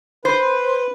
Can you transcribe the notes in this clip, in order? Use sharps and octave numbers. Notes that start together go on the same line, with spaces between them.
B4 C5